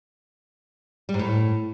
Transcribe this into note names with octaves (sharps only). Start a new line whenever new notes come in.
G3
G#2
A2